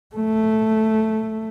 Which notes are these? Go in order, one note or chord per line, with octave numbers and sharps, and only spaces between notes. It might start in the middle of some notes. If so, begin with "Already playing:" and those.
A3